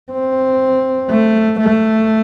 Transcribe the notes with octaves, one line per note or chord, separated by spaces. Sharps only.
C4
A3
A3